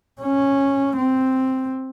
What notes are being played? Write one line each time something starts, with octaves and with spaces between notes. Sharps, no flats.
C#4
C4